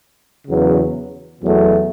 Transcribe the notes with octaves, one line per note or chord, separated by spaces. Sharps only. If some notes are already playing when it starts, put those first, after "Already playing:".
E2 C#3 F#3 B3
E2 B2 F#3 A3